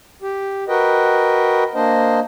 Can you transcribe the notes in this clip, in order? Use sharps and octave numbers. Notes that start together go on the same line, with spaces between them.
G4
F#4 A#4 B4 D#5 G5
A#3 D4 C5 D#5